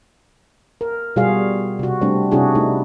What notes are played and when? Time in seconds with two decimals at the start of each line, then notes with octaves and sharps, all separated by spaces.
0.81 A#4
1.16 B2 G3 F4 F#4 G#4 F5
1.79 C3 F#4
2.01 G3 A3 C4 D4
2.31 C3 C#4 D4 E4 F#4 G#4
2.55 A3 D#4 E4